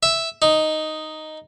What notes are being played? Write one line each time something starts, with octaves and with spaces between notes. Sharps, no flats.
E5
D#4